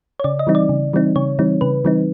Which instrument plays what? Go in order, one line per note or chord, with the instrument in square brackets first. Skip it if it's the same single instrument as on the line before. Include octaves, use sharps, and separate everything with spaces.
[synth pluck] C#5
C#3 D5
D#5
E3 G3 C4 D#4
D5
C#3
E3 G3 C4 D#4
C#3 C#5
E3 G3 C4 D#4
C#3 B4
E3 G3 C4 D#4